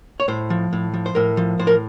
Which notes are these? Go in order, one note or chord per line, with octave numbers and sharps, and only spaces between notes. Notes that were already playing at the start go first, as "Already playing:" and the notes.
C#5
A2 C5
F3
A2
F3
C5
A2 A#4
F3
A2 C5
A#4